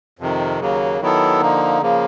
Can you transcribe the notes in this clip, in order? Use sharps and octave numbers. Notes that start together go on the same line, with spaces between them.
F2 C3 D#3
D#2 C#3 F#3 A#3
D#3 F#3 B3 E4 A4
D3 F3 A#3 D#4
C#3 F3 A#3